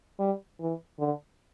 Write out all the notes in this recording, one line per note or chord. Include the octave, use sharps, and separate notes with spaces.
G3
E3
D3